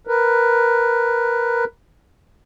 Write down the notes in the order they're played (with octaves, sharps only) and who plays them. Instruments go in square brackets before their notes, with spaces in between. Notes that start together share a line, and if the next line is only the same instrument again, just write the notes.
[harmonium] A#4 B4